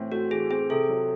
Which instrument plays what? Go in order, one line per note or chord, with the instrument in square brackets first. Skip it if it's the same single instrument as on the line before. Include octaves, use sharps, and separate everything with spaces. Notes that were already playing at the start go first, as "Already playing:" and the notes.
Already playing: [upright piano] A2 E3 C4
[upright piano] A3 [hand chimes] F#4
[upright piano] E3 [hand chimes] G#4
[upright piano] C4 [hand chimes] G#4
[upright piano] C3 [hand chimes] A4
[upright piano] F#3